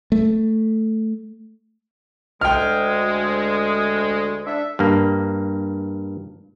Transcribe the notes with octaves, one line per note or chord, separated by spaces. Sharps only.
A3
D2 G#3 G5 F6
D4 A4 E5
G2 A#3